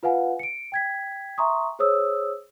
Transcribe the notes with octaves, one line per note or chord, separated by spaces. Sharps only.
F4 B4 F5 F#5 G#5
C#7 D7
G5 G#6 B6
E5 G#5 A#5 C6 C#6 D#6
G#4 C5 C#5 D#6 E6